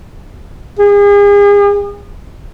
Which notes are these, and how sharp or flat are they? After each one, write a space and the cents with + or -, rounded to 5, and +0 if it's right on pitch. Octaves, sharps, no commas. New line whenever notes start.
G#4 -40